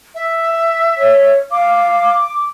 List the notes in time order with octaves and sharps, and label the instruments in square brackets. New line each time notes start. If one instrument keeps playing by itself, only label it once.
[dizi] E5
[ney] C#5
[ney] F5 [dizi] D6